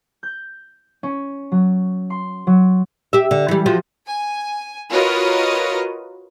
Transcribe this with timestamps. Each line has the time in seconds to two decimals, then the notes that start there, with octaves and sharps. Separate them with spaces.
0.23 G6
1.03 C#4
1.52 F#3
2.10 C6
2.47 F#3
3.13 G4 E5
3.31 D3
3.48 E3 G3
3.66 F3 F#4
4.08 G#5
4.90 F4 F#4 A#4 B4 C#5 D#5